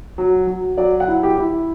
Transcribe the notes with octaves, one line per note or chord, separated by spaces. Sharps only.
F#3
F#3
F#3 D5
F#5
E4
G4
E4